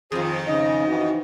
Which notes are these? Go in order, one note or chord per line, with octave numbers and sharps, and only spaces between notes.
F2 D#3 F3 G#4 C5
C#3 D#4 D#5
E3 F3 F#4